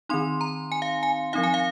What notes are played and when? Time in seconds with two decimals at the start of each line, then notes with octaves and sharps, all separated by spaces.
0.09 D#3 C4 D#4 C6
0.41 A#5
0.72 G#5
0.82 F5
1.03 G#5
1.33 F3 C4 D#4 F5
1.43 G#5
1.54 F5